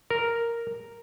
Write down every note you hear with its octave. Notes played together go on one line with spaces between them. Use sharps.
A#4